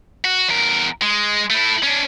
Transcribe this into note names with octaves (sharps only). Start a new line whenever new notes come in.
F#4
E2 A#4
G#3
A3 E4
C#4 D4